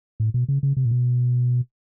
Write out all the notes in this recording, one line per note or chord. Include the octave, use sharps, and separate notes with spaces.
A2
B2
C#3
C#3
C3
A#2
B2